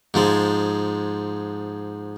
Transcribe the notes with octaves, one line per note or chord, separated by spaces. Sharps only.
G#2 F3 G#3